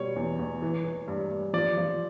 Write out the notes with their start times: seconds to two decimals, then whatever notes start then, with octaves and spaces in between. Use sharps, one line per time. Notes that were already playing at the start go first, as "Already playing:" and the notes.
Already playing: B2 G3 C#5
0.16 E2
0.39 E2
0.62 E3
0.85 E3
1.08 G2
1.31 G2
1.53 F3 D5
1.77 F3